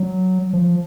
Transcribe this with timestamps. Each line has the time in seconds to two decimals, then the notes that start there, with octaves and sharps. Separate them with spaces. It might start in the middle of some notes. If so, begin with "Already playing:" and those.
Already playing: F#3
0.53 F3